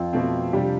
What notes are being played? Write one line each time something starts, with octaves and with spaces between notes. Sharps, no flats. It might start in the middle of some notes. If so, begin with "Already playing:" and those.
Already playing: F2
B2 A3 C4
C3 G3 D4 G4